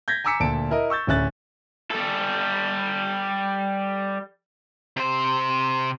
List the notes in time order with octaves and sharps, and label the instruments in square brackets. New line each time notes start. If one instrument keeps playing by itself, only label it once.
[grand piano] G6 G#6 A#6 B6
G#5 A#5 D6 E6 B6 C#7
D2 A#2 A5 D7
E4 A#4 D#5
C#6 E6 G6 A6
D1 D2 C#4 E5 F#6 A6
[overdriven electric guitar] G3 A4
C3 C5